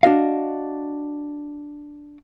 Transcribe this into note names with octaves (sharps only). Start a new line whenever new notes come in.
D4 F#4 D#5 F5